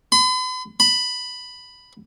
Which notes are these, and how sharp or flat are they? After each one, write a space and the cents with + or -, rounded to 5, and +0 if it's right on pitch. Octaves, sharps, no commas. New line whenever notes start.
B5 +45
B5 +5